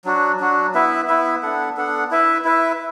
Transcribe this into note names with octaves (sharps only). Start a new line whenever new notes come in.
F#3 D4 F#4
F#3 D4 F#4
B3 E4 B4 E5
B3 E4 B4 E5
B3 D4 A4 F#5
B3 D4 A4 F#5
E4 B4 E5
E4 B4 E5